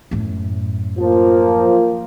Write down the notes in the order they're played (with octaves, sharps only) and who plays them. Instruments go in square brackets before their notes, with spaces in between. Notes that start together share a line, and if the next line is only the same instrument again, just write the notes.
[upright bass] F#2 A2
[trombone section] F3 A#3